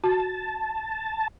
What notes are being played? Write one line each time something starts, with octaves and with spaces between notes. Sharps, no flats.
F#4 A5